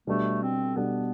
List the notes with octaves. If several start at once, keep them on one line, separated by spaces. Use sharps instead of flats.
B2 G3 A3 D4 A4
C4
B2 G3 B3 D4 A4